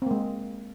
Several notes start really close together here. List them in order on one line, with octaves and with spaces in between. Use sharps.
C4 A#3 G#3